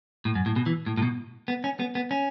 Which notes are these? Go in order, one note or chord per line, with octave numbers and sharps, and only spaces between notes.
A2
F#2
A2
B2
E3
A2
A2
B2
B3
C#4
B3
B3
C#4